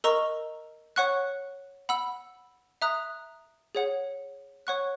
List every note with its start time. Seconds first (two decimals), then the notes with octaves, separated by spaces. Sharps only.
0.04 A#4 D#5 A#5 C#6 E6
0.96 C#5 F#5 C#6 F#6
1.89 F#5 B5 E6
2.82 E5 A#5 D#6 F#6
3.75 G#4 C#5 F#5
4.67 C#5 F#5 C#6 F#6